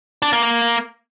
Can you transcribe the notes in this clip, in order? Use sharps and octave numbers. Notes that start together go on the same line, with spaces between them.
D4
A#3
A#3